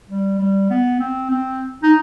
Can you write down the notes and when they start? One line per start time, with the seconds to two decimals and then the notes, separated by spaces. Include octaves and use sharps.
0.09 G3
0.39 G3
0.70 B3
1.00 C4
1.30 C4
1.83 D#4